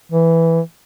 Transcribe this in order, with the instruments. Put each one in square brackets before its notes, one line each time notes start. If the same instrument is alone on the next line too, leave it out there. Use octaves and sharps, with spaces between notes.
[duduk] E3